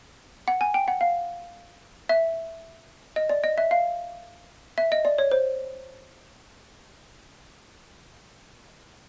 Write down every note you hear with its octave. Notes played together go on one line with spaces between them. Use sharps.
F#5
G#5
G5
F#5
F5
E5
D#5
D5
D#5
E5
F5
E5
D#5
D5
C#5
C5